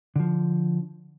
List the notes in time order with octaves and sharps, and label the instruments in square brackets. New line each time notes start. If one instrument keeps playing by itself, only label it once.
[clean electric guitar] D3 F3